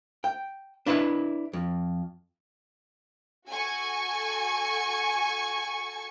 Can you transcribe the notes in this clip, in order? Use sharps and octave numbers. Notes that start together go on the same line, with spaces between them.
G5
D4 E4 B4 E5
F2
F#4 A4 G#5 C#6